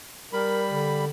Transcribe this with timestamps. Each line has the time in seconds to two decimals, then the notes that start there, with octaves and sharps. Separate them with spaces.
0.33 G3 A#4 B5
0.70 D3